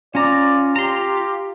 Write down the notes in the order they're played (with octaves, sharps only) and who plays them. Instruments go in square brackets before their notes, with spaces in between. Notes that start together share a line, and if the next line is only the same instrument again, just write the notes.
[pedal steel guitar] C#4 A#5 [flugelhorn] F4 [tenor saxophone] D5
[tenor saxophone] G4 [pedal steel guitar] A#5 C6